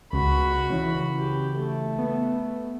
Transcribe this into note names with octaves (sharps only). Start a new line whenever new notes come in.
C#2 F#4 B5
C#3 E3
G4
A3
B3